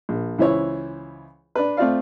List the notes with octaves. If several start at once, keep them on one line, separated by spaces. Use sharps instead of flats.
A#1
C#2 E3 E4 C5 C#5
D4 B4
A3 C4 F4 D5 F5